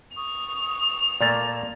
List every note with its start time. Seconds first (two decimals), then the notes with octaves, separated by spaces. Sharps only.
0.16 C#6 D#6 F7
1.21 A#2 A3 A#3 D5 A5 A6